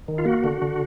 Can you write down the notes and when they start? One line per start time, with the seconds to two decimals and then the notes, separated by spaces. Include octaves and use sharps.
0.08 D#3
0.18 F4
0.25 A#3 F#4
0.44 D3
0.62 D3